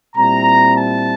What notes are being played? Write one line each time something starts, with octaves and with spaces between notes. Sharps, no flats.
A#2 G3 C4 E4 A#5
A5